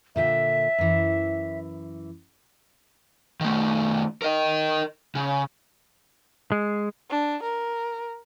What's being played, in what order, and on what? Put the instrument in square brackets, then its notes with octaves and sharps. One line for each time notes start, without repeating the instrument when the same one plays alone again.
[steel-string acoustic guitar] A#2 D3 G5 [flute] E5
[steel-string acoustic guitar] F#2 E3
[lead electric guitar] D#3 A3
A#4 D#5
C#3
[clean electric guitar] G#3
[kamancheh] D4
A#4